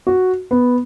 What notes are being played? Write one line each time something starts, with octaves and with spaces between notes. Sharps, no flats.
F#4
B3